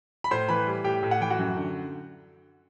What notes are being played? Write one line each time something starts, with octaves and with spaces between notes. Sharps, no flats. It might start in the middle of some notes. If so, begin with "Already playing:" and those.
B5
A2 C5 C6
E3 B4 B5
G3
A2 G4 G5
A2
F#5
E3 G5
F#4 F#5
F#2
D3